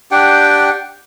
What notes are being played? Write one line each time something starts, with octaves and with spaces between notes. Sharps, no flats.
D4 G4 F#5 G5